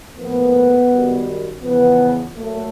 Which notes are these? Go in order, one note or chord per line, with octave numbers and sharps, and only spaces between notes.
A2 F3 A#3 B3
F#2 D#3 G3
E2 C#3 F3 B3
A#2 F#3 A3